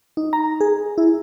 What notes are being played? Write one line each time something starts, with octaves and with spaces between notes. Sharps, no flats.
D#4
A#5
G#4
E4